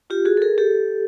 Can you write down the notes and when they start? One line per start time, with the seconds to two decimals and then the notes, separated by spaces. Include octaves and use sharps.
0.10 F4 G4
0.25 F#4 G#4
0.37 A4
0.42 G#4 A#4
0.58 G4 A4